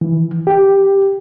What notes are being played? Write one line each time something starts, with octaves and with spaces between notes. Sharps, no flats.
E3
G4